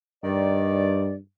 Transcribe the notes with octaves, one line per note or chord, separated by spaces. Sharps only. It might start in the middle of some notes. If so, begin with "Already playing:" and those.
G2 D#3 D5